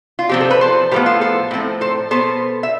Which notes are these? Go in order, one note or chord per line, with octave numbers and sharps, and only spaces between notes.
F4
C3 F3 C4 G4
A4
B4
A4 C5
A2 F3 B3 G4 B4
F4 A4
A4 C5
A2 F3 C4
A4 C5
B2 B3 A4 C5
E5